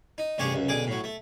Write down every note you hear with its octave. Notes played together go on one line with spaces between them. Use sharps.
D#4
A1 G2 C3 G4 G#4 C#6
C#2 F#2
B1 D3 G#4 D6
A2 F#3
A3